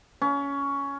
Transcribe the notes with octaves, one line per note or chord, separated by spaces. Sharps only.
C#4